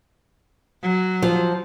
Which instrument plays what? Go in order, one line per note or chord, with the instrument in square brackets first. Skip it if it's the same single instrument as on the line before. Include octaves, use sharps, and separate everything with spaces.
[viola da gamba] F#3
[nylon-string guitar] F3